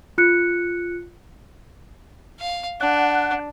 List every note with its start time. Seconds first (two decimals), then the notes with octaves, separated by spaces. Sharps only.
0.18 F4 F#6 C#7
2.40 F5
2.81 D4 F#5